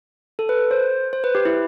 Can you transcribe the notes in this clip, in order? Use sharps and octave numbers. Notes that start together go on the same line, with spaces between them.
A4
B4
C5
C5
B4
G4
E4